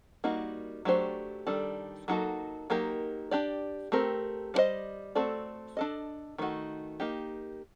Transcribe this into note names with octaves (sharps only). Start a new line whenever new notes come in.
G3 A#3 D#4 F#4
F#3 A3 D4 G4 C5
D#3 G3 D4 A4
F#3 A#3 D#4 F#4 A4
F#3 A#3 D#4 G4 A#4
D4 G4 D5
A3 C4 G4 A#4
G3 D4 F#4 C5 D#5
A3 C4 F#4 A4 D5
D4 A4 D#5
D#3 A3 D#4 F#4
A#3 D#4 G4